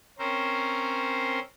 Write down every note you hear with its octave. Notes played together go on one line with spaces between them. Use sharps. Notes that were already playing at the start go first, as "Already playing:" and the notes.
C4 C#4 A#4 C5